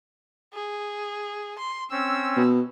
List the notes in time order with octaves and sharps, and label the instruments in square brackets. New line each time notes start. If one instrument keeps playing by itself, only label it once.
[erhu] G#4
C6
[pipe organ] C4 C#4 [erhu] E6
[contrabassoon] B2